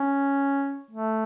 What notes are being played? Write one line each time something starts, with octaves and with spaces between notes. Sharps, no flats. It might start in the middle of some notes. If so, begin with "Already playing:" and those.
Already playing: C#4
A3